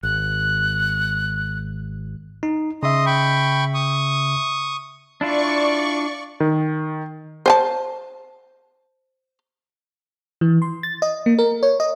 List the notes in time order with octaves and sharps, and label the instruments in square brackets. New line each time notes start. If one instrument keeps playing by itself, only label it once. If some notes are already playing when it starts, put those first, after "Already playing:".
[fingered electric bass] G#1 [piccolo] F#6
[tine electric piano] D#4
[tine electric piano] C#3 E5 [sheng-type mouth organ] D#5 C6 D#6
[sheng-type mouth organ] G5 B5 C#6
C#6 D#6
[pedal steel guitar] D4 E4 F4 [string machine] D5 C#6
[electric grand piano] D#3
[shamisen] C5 G#5 A5
[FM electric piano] E3
C6
A6
D#5
A#3
A#4
C#5
D#5